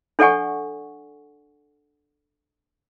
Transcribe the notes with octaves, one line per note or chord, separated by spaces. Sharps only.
D4 A4 D5 F#5 G#5 C#6